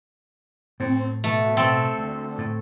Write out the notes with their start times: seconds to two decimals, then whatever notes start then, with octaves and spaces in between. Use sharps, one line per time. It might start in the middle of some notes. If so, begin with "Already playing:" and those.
0.80 A2 C4
1.24 B2 A3
1.57 C4 A4
1.98 D2
2.38 A2